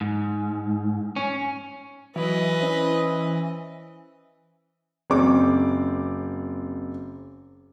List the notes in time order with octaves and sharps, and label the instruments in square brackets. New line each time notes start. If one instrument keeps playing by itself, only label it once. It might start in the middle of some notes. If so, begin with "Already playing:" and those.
[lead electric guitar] G#2
C#4
[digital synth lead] E3 [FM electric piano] F#3 [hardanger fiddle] B4 D#5
[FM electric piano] C#4 C5
[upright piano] F#1 C4 D6